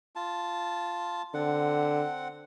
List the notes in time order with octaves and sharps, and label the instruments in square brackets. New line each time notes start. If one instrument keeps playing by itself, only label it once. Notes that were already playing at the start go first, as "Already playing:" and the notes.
[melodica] F4 A5
[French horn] D3 [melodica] C4 F#5